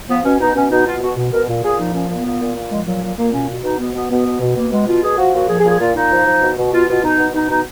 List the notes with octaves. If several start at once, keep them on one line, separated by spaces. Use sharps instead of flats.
F3 B3
B2 C#4
B2 D#4
B2 C#4
B2 D#4
B2 F4
B2 F#4
B2
B2 A#4
A#2
A#2 G#4
F3 D#4
A#2 C#4
A#2 B3
A#2
A#2
A#2
F3 G#3
A#2 F#3
A#2 F#3
A#2 A#3
B2 C#4
B2
B2 D#4
B2 B3
B2 B3
B2 B3
B2
B2
B2 A#3
B2 G#3
B2 F4
B2 G#4
F3 F#4
A#2 F#4
F3 G#4
G#4
A#2
G#4
A#2 F4
A#2 D#4
F3
F3
B2
B2
B2 F4
B2 F4
B2 D#4
B2
B2 D#4
B2 D#4